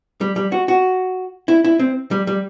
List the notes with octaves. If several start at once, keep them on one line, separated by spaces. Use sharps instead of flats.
G3
G3
F#4
F#4
E4
E4
C4
G3
G3